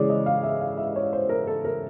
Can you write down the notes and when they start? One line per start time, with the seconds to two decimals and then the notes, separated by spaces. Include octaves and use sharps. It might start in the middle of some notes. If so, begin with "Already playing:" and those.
Already playing: C#3 E3 G#3 C#5 D5
0.09 D#5
0.26 F5
0.43 E5
0.61 F5
0.77 E5
0.96 C#5
1.13 C5
1.29 A#4
1.47 A4
1.65 A#4